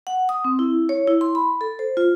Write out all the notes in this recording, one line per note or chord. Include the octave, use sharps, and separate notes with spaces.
F#5
D#6
C4
E4
C#5
E4
C6
B5
A4
C5
F4